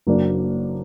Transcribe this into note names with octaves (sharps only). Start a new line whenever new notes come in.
F#1 F#2 F#3 A#3 D4